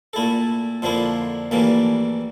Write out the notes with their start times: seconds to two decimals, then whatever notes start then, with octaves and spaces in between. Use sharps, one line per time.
0.13 A#2 A3 E4 A4
0.82 F2 D3 F3 A#3 E4
1.51 A#1 A2 E3 G3 A#3